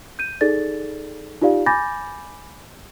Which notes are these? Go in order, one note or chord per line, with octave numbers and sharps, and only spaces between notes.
G6 D#7
D#4 G#4 A4 D5 A6
D#4 F4 G4 D5 F5
G#5 B5 D6 G6 A6 A#6